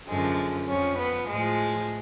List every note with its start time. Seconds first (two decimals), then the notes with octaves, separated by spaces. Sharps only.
0.08 F#2 D3 F3 G#3
0.68 F2 F3 C#4
0.99 B3
1.28 A2 F3 G#3